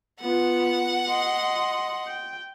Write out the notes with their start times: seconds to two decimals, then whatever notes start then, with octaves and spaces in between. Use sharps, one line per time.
0.21 B3 F4 F#5
1.08 D#5 C6
2.07 G5